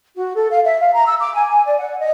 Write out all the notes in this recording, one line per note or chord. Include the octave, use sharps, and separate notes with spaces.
F#4
A4
F5
E5
F5
A#5
E6
D6
G#5
D5
F#5
D#5